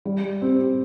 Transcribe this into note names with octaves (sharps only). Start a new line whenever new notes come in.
G3
C4 G4